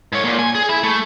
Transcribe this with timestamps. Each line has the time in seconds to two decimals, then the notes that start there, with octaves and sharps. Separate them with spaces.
0.13 G#2 C#5
0.24 A#2
0.39 G#5
0.55 G#4
0.69 E4
0.83 A3